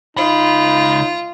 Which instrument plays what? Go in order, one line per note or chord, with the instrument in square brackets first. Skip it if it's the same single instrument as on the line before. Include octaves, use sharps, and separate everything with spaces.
[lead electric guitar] C#2 B5 [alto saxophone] D#4 [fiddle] F4